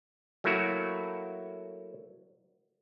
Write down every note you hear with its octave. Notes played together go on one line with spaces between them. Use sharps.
F#3 A3 A#3 E4 F#4